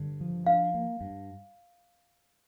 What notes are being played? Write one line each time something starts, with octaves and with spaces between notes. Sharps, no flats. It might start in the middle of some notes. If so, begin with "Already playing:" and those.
Already playing: G2 D3
F3
D4 F5
A#3
G2